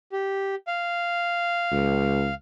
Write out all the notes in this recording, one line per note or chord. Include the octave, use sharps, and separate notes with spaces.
G4
F5
C#2